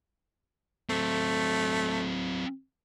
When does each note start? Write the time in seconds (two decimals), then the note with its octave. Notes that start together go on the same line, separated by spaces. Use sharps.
0.89 F#3 A3 C4